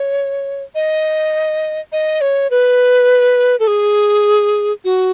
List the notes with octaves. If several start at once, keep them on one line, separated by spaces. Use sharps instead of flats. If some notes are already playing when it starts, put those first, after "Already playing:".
Already playing: C#5
D#5
D#5
C#5
B4
A4
G#4
F#4